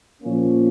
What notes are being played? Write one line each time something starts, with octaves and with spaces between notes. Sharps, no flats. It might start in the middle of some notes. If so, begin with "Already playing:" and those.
A#2 F3 A#3 C#4